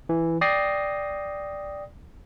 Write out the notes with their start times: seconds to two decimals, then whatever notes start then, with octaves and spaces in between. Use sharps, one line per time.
0.09 E3
0.41 D5 G5 D#6 A#6 C7